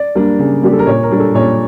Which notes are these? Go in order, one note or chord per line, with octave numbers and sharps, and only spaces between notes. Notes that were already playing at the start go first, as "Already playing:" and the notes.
Already playing: D5
G3 A#3 D4
C#3
G3 A#3 D4 G4
A4
A#4
A#2 C#5
A#4
G3 D4
A4
A#2 C#5